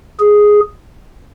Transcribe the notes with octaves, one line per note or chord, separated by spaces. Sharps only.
G#4